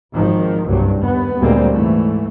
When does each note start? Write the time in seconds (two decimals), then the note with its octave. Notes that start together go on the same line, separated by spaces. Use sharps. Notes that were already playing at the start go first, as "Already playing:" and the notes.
0.13 G#1 D#3 F3
0.65 F#1 C2 G2 F#3
1.00 D#2 B3
1.39 D2 A#2 G3 G#3 A#3 C4
1.72 G#2 E3 A3